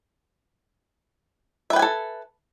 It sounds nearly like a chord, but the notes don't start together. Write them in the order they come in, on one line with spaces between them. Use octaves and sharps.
E5 B4 G5 G#5 A4